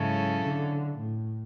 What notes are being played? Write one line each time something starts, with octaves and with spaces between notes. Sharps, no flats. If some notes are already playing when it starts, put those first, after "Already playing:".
Already playing: G#2 C#3 F#3 C#4 E4 A4
D3
A2